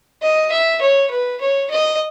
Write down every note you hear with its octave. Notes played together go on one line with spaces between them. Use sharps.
D#5
E5
C#5
B4
C#5
D#5